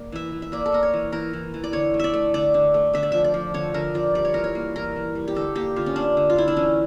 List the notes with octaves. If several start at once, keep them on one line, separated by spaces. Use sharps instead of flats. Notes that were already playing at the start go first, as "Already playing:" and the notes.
Already playing: A#3 D5
E3 E5
E3
E5
A#3 D5
A4
A#3 A#4
C#5
E3
E3 A#4
E3
E3
D5
D3 C#5
A3
D5 E5
A3
D3 D5
D3
A3
D3 E5
D5
F3 E5
D5
F3
D3 C#5
D3 A#4
F3 D5
G3 D5
C#5
E3 A#4
C#5
A#3
E3 A#4
E3
G3
G4
D3 A4
A#3 G4
D3 F4
C#4
A#3 D4
D3
F4
D3 E4
D4
E3 C#4